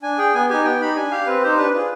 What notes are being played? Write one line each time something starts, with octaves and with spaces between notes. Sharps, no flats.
D4 G#5
G#4 G5
B3 G#5
D#4 G4 G#5
B3 G5
D#4 G4 B5
D4 G#5
G4 F5
C4 B4
D#4 G4 C5
D4 B4
F4 G#4